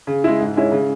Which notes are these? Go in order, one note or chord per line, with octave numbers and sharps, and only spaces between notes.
C#3
G#3 E4
G#2
G#3 C#4 E4
C#3